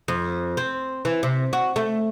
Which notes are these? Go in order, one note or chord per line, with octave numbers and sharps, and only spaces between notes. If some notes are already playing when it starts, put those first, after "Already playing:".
F2
C4
E3
C3
F#4
A3